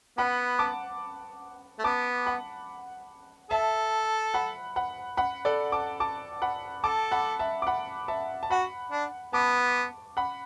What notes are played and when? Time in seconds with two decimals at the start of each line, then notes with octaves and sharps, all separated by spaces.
0.18 B3 F#5 B5
0.59 A5 D6
1.79 A3
1.84 B3 A5 D6
2.26 F#5 B5
3.51 A4 E5 A5
4.34 F#5 B5
4.76 F#5 B5
5.17 F#5 B5
5.45 A4 D5
5.72 A5 D6
6.00 A5 D6
6.42 F#5 B5
6.84 A4 A5 D6
7.11 F#5 B5
7.39 E5 A5
7.62 D6
7.67 F#5 B5
8.08 E5 A5
8.43 A5
8.50 F#4 F#5 B5
8.92 D4
9.33 B3 A5 D6
10.17 F#5 B5